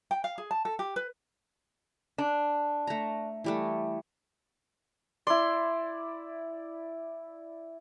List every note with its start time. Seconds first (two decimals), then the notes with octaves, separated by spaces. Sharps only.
0.11 G5
0.24 F5
0.38 G#4
0.51 A5
0.65 A4
0.79 G4
0.96 B4
2.18 D4
2.87 A3 A#5
3.44 E3 G3 A3
5.27 E4 D5 C6